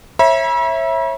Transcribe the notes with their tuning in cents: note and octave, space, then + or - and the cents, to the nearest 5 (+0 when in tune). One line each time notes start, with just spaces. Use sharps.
C#5 -35 E5 +0 B5 -45